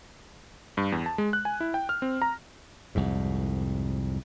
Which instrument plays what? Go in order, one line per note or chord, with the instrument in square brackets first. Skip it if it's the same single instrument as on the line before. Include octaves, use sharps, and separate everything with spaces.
[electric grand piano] G2
E2
A5
G#3
F#6
G#5
E4
G5
F6
C4
A#5
[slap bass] C2 F2 G#2